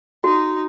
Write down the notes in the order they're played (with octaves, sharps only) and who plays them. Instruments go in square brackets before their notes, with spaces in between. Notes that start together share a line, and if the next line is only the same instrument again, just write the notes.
[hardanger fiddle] D#4 [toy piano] F#4